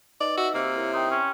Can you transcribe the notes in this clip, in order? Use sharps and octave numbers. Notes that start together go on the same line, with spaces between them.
D#4 B4 D5 D#5
F#4 E5
C3 A#3 E6
E4 A#4 C#5
D#4 G5 A#5 C6
C#4